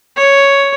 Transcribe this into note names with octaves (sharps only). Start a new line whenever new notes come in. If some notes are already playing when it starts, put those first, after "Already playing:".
C#5